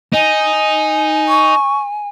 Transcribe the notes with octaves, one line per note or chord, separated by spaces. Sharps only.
D#4 G#5
C#6